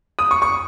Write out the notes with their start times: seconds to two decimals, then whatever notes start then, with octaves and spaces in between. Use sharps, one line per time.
0.19 D#6
0.31 C#6
0.42 C#6